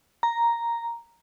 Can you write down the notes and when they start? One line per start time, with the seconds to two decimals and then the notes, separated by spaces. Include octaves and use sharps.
0.23 A#5